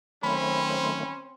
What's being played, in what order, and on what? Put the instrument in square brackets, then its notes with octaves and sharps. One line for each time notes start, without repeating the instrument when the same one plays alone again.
[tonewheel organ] D#3 F#3 A3 [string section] C4 C5 [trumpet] C#4 [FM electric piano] B5